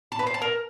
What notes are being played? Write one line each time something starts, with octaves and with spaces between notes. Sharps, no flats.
A5
B4
C5
A5
A#4